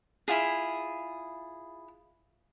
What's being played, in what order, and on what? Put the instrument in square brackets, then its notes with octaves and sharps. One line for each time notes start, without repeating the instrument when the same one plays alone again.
[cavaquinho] E4 F4 G#4